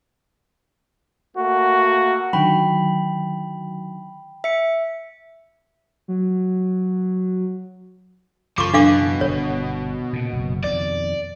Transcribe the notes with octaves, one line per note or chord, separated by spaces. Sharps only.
A3 A#3 F#4
D3 D#3 F#3 G5 B5
E5 C#7
F#3
F#2 C#3 E3 F3 C#6 D6
B2 D4 F5 D6
G1 C#5
A#2 C#3
F#1
F2 B2 D#3 D5